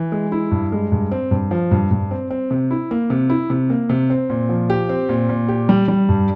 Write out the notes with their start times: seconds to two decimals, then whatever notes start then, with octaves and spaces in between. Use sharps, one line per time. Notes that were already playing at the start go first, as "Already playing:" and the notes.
Already playing: E3
0.12 G#3
0.32 E4
0.51 G2
0.72 G#3
0.92 G2
1.12 C4
1.31 G2
1.51 F3
1.71 G2
1.91 G2
2.11 C4
2.31 C4
2.51 C3
2.71 E4
2.91 A#3
3.10 C3
3.30 E4
3.50 C3
3.70 A#3
3.89 C3
4.10 C4
4.30 A#2
4.49 F3
4.70 G4
4.89 C4
5.09 A#2
5.29 A#2
5.48 G4
5.69 G3
5.88 G3
6.09 G2